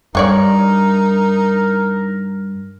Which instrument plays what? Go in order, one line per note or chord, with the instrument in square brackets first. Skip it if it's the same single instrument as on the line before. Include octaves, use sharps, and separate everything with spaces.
[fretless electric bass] G2 [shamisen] D4 C#5 D5 [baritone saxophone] D#4 [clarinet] A#4